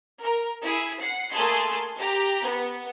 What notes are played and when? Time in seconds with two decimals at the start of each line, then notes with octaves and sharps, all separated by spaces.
0.19 A#4
0.61 E4 G#4
0.99 F#5 C7
1.32 A3 A#3 G#4 A5 C6
1.98 G4 A#5
2.43 B3